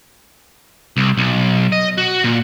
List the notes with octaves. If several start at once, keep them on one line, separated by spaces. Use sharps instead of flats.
C2
B1
D#5
F#4
A#2